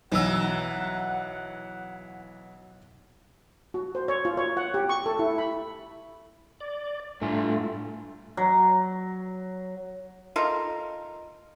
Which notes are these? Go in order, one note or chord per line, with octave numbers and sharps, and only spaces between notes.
B1 E3 F#3 F#5 E6
F#4
C5
C#5
F4
C#5
F#5
G4
C#6
A4
E4
B5
D5
A2 G3 A3 D4 F4 G#5
F#3
D#4 F4 A4 A#4